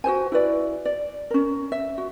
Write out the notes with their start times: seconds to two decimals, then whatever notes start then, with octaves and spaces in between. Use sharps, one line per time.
0.04 F#4 G#4 C5 G#5
0.32 E4 F#4 B4 D5
0.85 D5
1.30 C#4 A#4
1.72 E5
1.98 F#4